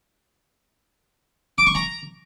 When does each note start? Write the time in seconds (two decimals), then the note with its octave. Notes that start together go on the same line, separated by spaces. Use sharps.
1.58 D6
1.66 C#6
1.75 A#5